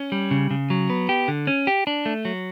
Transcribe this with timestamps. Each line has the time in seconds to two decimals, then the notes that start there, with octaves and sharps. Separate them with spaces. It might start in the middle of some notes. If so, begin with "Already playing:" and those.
Already playing: C#4
0.12 G3
0.31 C#3
0.51 C#3
0.70 F#3
0.90 B3
1.09 G4
1.28 D3
1.47 C#4
1.67 G4
1.87 D4
2.06 A3
2.25 F#3